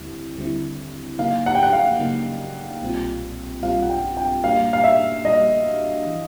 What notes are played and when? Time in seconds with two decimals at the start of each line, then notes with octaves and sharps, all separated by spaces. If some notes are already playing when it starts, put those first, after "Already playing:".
Already playing: D#2 D3 G3 C4 E4
0.38 D#2 D3 G3 C4 E4
1.19 C#3 F#3 A#3 D#4 F5
1.46 F#5
1.55 G5
1.63 F#5
1.73 F5
1.99 C#3 F#3 A#3 D#4
2.82 B1 A#2 G3 C4 F4
3.63 B1 A#2 G3 C4 F4 F5
3.82 F#5
3.89 G5
4.17 G5
4.43 A#2 G3 A#3 D4 F#4 F5
4.73 F5
4.84 E5
5.25 A#2 G3 A#3 D4 F#4 D#5
6.06 E3